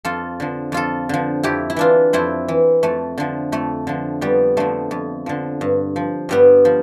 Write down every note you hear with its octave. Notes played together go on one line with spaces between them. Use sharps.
F2 F4 A4
D3 F3
F2 F4 A4
D3 F3
F2 E4 G4
E4
E3 D4 F4
F2 C4 E4
E3
F2 A3
D3 F3
F2 A3
D3 F3
F2 G3 B3
D3 F3 A3
F2
D3 F3
G2
F3
G2 G3 B3
F3